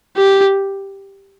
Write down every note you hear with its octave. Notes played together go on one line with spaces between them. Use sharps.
G4